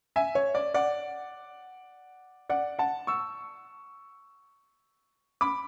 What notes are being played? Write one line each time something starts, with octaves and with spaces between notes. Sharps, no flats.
E5 G#5
C#5
D5
D5 F#5
D5 F#5
F#5 A5
C#6 E6
B5 D6